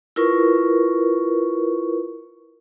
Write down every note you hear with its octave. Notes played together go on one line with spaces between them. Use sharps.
E4 F4 A#4 B4 C#6